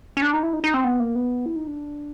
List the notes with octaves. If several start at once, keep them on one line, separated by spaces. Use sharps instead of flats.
C#4
D4
D#4
E4
D#4
D#4
C4
B3
A#3
B3
E4
D#4
D4